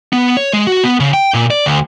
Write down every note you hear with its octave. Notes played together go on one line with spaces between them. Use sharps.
B3
C#5
G#3
F#4
B3
C#3
G5
A#2
D5
D2